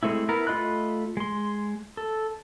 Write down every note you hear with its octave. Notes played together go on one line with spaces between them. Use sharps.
G#3 A3 C4 E4
B3 E4 A#4
A3 F4 D#5 B5 F#6
G#3 C6
A4